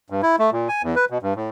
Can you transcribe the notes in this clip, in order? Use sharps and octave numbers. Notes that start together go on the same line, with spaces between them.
G2
E4
A3
A#2
G#5
E2
B4
B2
G2
A2